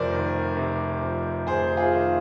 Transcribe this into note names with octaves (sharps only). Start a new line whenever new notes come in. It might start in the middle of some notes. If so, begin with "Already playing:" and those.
Already playing: F1 F2 C3 A#4 C5 D5
D#3
C3
F2
F1 G#4 C5
F4 G#4
D#3